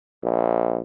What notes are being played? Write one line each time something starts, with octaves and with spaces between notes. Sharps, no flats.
A#1